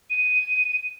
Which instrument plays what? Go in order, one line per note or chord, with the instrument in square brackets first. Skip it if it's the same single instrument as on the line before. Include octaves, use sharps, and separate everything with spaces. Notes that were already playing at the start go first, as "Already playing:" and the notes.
[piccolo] D#7